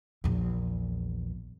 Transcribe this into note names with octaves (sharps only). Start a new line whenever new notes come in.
A#1 E2